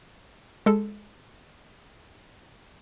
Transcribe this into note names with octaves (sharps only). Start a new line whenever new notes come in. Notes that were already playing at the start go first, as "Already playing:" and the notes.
G#3 A4